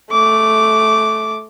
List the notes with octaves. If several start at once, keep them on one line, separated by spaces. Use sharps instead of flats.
A3 D6